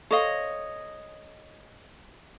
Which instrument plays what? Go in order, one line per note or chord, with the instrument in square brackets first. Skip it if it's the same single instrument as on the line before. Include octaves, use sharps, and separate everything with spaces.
[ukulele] A4 C5 F5 [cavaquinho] C#5 D#5